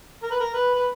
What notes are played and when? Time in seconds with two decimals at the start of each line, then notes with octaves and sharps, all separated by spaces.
0.23 A#4
0.31 B4
0.40 A#4
0.54 B4
0.74 B4